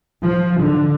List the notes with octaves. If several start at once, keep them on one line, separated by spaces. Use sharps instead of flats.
F3
D3